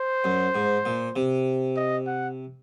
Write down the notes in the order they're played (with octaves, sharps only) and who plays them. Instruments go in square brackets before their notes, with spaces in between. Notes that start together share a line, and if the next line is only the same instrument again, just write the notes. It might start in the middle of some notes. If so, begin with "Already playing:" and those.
Already playing: [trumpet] C5
[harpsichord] F#2
G#2
A#2
C3
[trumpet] D#5
F#5